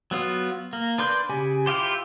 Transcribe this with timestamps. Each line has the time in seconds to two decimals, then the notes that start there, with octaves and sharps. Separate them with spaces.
0.11 F#3 B3 F4
0.73 A#3
0.98 D4 B4 C6 G6
1.29 C#3 G4 G#5
1.66 E4 F4 G4 C5